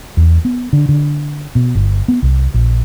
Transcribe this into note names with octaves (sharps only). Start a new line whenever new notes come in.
E2
B3
D3
D3
B2
G1
B3
C2
A#1